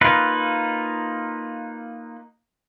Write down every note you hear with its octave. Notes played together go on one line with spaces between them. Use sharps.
A#3 D#4 F4 B4